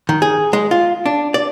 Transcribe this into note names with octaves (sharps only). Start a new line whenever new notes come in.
D#3
G#4
G#3
F4
D4
D5